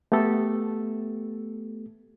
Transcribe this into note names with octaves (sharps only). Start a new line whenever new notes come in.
A3 B3 G4 A4